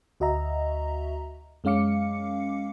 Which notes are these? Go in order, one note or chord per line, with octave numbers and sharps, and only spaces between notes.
D2 F#4 D#5 E5 A#5
F#2 G#3 C#4 F5 D6 C#7